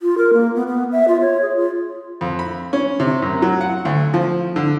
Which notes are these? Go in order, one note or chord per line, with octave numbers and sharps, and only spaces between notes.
F4
A#4
A#3
B3
B3
E5
F4
C#5
G#4
F4
F2
B5
C#4
C3
F#2
F#3
F#5
D2
F3
D3